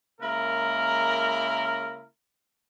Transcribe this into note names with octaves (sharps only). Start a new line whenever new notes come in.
C#3 G#3 A#3 E4 A#4